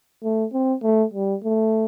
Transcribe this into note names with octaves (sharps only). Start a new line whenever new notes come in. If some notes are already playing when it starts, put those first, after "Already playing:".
A3
C4
A3
G3
A3